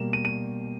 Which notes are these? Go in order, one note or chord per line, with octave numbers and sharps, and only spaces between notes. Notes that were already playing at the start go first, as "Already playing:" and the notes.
Already playing: B2 G3 A#3 E7
D#7
D#7